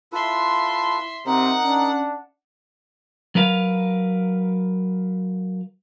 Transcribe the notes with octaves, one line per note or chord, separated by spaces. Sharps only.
E4 F4 A4 B4 E5 C6
C3 C4 D#4 A#4 F#5
C#4 D4
F#3 A#4 B4 F5